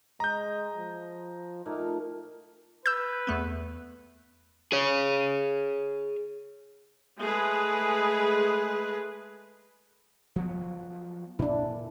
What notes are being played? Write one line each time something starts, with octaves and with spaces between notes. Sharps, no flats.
G#3 D#5 A#5 G6
F3
A#2 A3 A#3 D#4
B4 E6 G6
E2 A3 B3
G#4 C#5
G#3 A3 G#4 B4
F3 F#3 B3
A#2 D4 E4